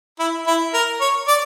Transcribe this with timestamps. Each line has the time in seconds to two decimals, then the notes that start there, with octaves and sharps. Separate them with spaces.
0.19 E4
0.47 E4
0.74 A#4
1.01 C#5
1.28 D5